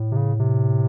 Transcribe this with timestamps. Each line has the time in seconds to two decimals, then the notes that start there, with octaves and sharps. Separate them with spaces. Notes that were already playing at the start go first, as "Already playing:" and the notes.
Already playing: A2
0.12 C3
0.16 C#3
0.39 C3